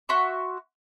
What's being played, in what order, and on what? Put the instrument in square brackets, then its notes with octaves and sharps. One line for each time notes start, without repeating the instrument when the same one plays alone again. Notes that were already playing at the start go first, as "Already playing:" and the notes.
[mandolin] F#4 E5 C6 C#6